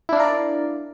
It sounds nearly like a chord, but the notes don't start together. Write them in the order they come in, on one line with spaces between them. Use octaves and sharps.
E4 D4 F5 A#4 D5